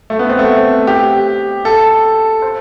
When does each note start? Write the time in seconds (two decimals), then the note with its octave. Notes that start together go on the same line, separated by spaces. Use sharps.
0.10 A3
0.19 B3
0.29 C4
0.39 A3
0.87 G4
1.65 A4
2.42 C5